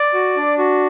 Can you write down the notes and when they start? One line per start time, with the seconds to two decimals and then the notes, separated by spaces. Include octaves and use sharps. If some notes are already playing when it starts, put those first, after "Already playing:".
Already playing: D5
0.14 F#4
0.37 D4
0.58 F#4